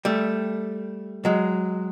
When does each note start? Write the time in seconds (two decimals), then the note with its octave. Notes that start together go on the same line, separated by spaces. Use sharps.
0.05 G3 A3
1.25 F#3 G#3